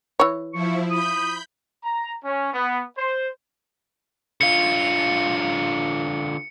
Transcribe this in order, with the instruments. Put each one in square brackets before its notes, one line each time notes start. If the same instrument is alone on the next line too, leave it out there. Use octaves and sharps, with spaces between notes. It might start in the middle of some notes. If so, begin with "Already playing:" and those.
[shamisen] E3 C#5
[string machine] F3 E4 [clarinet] C#6
[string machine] B5 G6 [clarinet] D#6
[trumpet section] A#5
C#4
B3
C5
[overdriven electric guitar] D3 F4 [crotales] C#7